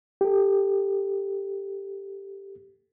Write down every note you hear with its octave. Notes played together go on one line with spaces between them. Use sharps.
G4 A4